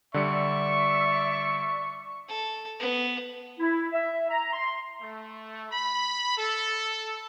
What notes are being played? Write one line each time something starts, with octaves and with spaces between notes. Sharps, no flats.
D3 G3 D5 E5 C#6 C#7
A4
B3
E4
E5
A#5
C6
A3
B5
A4